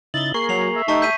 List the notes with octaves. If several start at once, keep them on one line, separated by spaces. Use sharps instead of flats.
C#3 D#4 E4 A6 F#7 G7
A#3 G#4 A#4 C#6 C7
F#3 C7 F7
E5
A3 D#4 G4 A5 C#6 B6
G6 B6 D#7